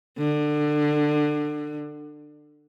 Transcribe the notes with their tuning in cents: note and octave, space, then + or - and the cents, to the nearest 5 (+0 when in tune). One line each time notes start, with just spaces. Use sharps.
D3 +25